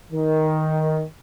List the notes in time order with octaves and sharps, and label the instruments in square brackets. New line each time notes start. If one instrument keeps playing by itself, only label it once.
[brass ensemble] D#3